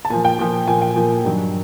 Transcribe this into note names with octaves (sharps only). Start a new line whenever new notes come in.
A5
A#2 F3 G#5
G5
A#2 F3
A#2 F3 G#5
G5
A#2 F3
G2 D#3 F#3